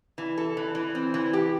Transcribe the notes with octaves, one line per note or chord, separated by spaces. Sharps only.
E3
A4
E3
E3
C4
E3
G4